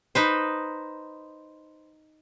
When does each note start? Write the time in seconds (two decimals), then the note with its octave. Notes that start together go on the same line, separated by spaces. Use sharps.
0.15 D#4 B4 C5